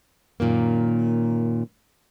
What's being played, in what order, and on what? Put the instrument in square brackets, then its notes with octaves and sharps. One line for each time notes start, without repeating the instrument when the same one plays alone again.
[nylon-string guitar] F#2 A#2 D#3 A#3